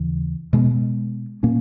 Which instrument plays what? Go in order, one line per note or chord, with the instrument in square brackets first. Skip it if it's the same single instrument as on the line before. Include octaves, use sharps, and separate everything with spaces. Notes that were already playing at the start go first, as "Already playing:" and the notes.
Already playing: [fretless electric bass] D#2 C#3 E3
B2 G#3 B3
A#2 A#3 C#4